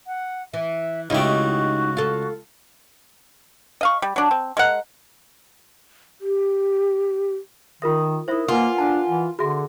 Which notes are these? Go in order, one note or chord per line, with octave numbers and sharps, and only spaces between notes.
F#5
E3 E5
C#2 A3 D#4 E4 F#4 G4
F4 A4
D#5 F5 C#6
G3
F#3 D4
C4
G#3 A#4 F#5
G4
D#3 F4 A#4 E5 D#6
D#4 E4 A#4 C5 E5 D#6
A#3 F4 A#4 B4 F#5 G#5
D4 A5
E3
D3 F#4 G#4 E5 C6